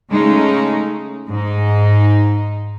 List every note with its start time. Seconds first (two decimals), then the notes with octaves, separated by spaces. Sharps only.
0.10 C#3 G#3 A3 C#4 D#4
1.29 G#2 D#4